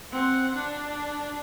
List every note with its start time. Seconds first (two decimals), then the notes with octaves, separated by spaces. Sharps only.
0.12 C4 F#5
0.56 D4